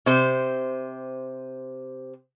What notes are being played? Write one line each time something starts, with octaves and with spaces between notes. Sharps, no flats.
C3 C5